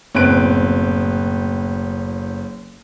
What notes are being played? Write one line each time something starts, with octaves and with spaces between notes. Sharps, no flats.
F#1 A2 B3 C4 F#6 D7